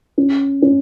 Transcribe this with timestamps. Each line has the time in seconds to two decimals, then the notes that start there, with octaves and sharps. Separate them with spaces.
0.18 C#4
0.62 C#4